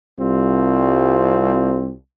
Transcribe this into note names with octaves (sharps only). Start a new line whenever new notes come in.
C2 G3 C4 F4